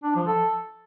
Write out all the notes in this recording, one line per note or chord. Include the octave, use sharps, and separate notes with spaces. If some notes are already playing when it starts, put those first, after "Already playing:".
D4
F3
A4